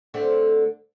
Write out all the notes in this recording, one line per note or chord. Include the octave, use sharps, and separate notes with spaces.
D3 A3 C4